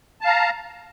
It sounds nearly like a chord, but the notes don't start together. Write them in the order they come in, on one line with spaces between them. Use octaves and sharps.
A5 F5 A#5